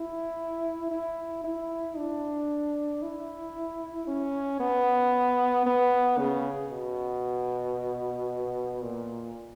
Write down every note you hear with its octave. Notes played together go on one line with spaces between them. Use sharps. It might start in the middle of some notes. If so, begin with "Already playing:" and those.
Already playing: E4
E4
E4
D4
E4
C#4
B3
B3
C#3
B2
A#2